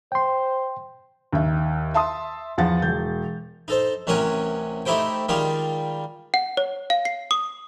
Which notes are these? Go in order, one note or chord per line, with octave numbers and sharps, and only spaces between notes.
C5 G5 C6
D#2 E5
E5 A5 C6 D#6
E2 F3 F#5 A6
E1 G6
D#4 A4 C5
A1 C3 C#4 A#4 F#5 G#5
A3 D#4 E4 G4 C5 G5
D#3 G3 G#3 F4 G4
F#5
C#5
F5
C7
D#6